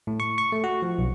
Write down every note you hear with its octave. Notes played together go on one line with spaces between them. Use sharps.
A2
C#6
C#6
A3
F#4
F3
B1